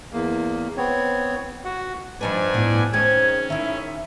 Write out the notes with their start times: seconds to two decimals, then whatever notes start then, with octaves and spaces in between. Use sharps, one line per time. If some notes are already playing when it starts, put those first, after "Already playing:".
0.12 E2 A#3
0.77 B3 C4 C#5
1.65 F#4 F#5
2.21 G2 F3 D4 D#4 B4 G#5
2.54 A2 B3
2.93 D#3 G#3 C4 C#4 G#6
3.50 D#3 E4 E5